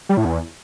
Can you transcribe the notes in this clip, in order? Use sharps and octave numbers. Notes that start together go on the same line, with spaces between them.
G3
A2
E2